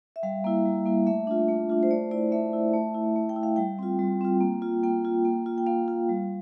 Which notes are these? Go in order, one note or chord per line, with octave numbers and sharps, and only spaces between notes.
E5
G3 F5
A#3 E4
G3
A#3 E4
A3 E5
D4 F4
A3
D4 F4
C5
A3 D5
E4 D5
A3 E5
E4
A3
E4
A3
G5
E4
F5
G3 G5
C4 F4
G3
C4 F4
A#3
F4
A#3 G5
F4
A#3
F4
G5
A#3 F5
F4
G3